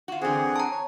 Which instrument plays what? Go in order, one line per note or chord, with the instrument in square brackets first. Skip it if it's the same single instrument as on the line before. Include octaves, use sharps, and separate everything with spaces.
[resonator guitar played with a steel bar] F4 F#4
[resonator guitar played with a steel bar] D3 E3 [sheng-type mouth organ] C4 G#4 F#5
[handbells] A5 A#5
[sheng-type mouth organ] C#5